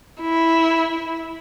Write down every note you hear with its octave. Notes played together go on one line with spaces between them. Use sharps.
E4